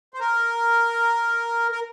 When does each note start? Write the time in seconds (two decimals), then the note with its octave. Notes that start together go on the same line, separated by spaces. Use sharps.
0.14 C5
0.20 A#4
1.72 A#4